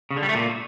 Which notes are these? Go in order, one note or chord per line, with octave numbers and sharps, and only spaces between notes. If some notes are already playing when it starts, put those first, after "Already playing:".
C#3
D3
G3
A3
A#2